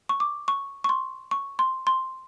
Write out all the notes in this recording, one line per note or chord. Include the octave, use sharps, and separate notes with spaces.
C#6
D6
C#6
C#6
C6
C#6
C6
C6